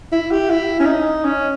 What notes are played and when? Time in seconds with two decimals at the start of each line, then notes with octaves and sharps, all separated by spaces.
0.12 E4
0.31 G4
0.50 E4
0.80 C#4
0.86 D#4
1.25 C#4